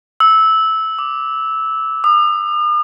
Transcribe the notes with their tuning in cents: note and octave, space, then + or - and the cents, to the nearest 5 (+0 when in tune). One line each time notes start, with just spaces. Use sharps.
E6 -15
D6 +0
D#6 -45